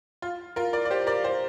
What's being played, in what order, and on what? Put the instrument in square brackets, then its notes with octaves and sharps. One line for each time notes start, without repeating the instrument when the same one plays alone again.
[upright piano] F4
F4 A#4
A#4 D5
D5
G4 C5
A#4 D5
G4 C5